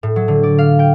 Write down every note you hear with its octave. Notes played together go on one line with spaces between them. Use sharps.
A2
F#3
D3
D5
F5
G5